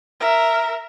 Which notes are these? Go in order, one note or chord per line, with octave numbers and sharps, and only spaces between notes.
A#4 E5